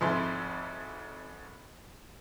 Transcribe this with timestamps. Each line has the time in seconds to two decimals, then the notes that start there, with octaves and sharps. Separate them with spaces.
0.01 G#1 F2 E4 C6